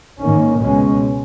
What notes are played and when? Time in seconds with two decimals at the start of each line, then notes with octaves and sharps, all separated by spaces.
0.20 G#2 D#3 A#3 C#4
0.59 C#2 B2 G#3 C#4